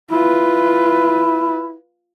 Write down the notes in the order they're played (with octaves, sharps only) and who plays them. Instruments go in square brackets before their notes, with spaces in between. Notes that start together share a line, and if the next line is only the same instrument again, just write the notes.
[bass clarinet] E4 [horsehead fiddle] F4 B4